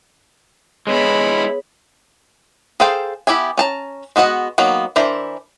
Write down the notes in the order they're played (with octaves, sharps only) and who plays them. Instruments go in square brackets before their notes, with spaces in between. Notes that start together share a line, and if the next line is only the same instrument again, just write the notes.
[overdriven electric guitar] G#3 E4 [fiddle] B3 B5 [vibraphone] G#4 C#5
[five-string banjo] G#4 A4 C5 F5 G5
B3 E4 G4 E5 G#5
C#4 A5 A#5
G#3 B3 F#4 D#5 F#5
D#3 F#3 A#3 B3
E3 D4 A#4 C5 E5